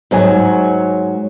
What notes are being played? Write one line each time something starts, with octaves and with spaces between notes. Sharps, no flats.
G#2 F#3 C#5 G#5